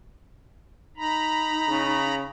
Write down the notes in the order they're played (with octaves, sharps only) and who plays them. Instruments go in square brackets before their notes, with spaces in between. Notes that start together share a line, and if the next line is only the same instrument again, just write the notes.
[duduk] D#4 [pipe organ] A#5 B5
[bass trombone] C#3